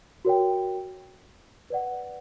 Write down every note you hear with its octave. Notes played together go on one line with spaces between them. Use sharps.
F#4 A#4 C#5 G5
B4 D5 F#5